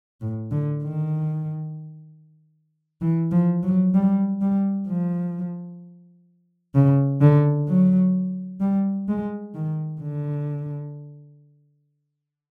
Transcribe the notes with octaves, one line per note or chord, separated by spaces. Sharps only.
A2
D3
D#3
E3
F3
F#3
G3
G3
F3
C#3
D3
F#3
G3
G#3
D#3
D3